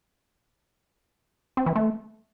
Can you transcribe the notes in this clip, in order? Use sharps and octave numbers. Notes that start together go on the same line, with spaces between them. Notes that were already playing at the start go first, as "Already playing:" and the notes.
C4
E3
A3